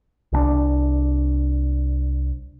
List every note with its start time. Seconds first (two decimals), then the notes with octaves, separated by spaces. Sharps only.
0.33 C2 G3 D4